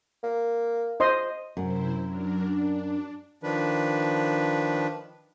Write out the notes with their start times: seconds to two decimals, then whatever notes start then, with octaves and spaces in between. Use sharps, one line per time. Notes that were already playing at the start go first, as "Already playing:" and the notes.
0.23 A#3
1.00 C5 D#5 C6
1.57 F#2 C3 E4 C5
2.03 F#3 D4 A#4
2.42 D4
3.43 D#3 F3 D4 B4